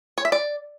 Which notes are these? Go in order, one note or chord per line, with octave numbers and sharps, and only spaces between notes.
C#5
E5
D5